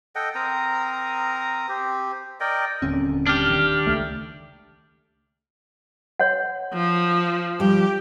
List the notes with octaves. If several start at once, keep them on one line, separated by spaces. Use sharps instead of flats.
A4 D#5 F#5 G5
C4 A#4 A#5 D#6
C4 G4
A#4 D5 D#5 G5
D#1 D3 C4 C#4
D4 G4 F6
D#3
C#2 A3
C#5 F#5
F3
F3 G3 G4